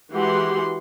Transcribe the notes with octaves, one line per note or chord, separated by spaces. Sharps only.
E3 G#3 F#4 G4 F#5 C6